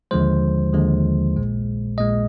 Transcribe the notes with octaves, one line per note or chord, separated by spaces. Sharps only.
D#2 D3 F3 G#3 C5
D#2 D3 F3 G#3
A#1 A#2 G#3
A#1 A#2 G#3 D#5